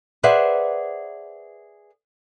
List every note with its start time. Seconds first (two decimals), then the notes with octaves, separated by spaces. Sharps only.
0.23 G#4 B4 C5 D5 E5 F#5